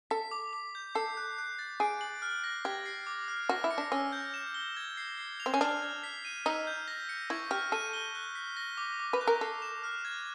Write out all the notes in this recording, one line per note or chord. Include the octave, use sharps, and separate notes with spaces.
A4 B6
D6
D6
G6
A4 C7
F#6
F#6
A6
G#4 D7
F#7
F6
A#6
G4 G#6
C7
D6
F6
F#4 A#6
E4
C#7
D4
C#4 E6
G6
E7
G7
G#6
C7
C7
F7
C4
C#4
D4 F6
G#6
B6
D#7
D#4 E6
G6
A#6
C#7
E4 C#6
G4 F6
A4 D#7
G7
F#6
B6
A#6
D6
D6
B4
F#6
A#4
A4 C7
E7
F6
G#6